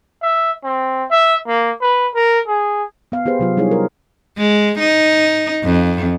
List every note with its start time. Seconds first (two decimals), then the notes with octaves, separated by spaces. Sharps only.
0.22 E5
0.64 C4
1.10 E5
1.48 A#3
1.82 B4
2.15 A#4
2.47 G#4
3.12 B3 F5
3.26 B3 G4 G#4 B4 C5
3.39 C3 F#3 F4
3.57 G3 D#4 E4 G#4 C#5
3.71 A#4
4.38 G#3
4.79 D#4
5.63 F2